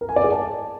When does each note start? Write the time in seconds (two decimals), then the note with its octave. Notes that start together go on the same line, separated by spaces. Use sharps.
0.01 A#4
0.09 G#5
0.16 D5
0.24 G#4
0.32 A5